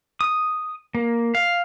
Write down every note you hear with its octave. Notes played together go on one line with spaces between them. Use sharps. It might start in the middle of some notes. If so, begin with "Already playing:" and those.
D#6
A#3
F5